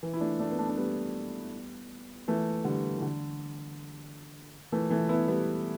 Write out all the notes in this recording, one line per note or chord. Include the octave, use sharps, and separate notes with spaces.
E3
E4
A3 D4
A3 D4
B3
A3 D4
D4
G3 B3
E3 A3
D3 G3
E3
D3
E3 A3
E3 A3
B3 E4
G3 B3